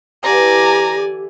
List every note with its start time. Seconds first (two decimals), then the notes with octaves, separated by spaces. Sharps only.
0.24 D3 E3 G4 D5 G#5 A#5